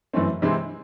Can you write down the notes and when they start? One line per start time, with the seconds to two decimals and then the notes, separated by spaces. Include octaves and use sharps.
0.13 F#2 E3 A3 C4
0.42 C3 E3 G#3 C4 E4